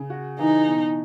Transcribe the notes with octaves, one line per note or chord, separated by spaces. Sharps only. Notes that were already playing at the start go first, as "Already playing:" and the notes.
Already playing: C#3
F#4
E3 D#4
B2